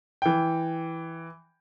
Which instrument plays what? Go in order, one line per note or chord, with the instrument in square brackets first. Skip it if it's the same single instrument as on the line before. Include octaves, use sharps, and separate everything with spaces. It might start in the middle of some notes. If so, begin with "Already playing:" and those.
[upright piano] E3 G5